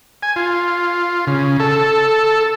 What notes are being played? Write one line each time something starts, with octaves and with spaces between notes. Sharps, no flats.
G#5
F4
C#3
A4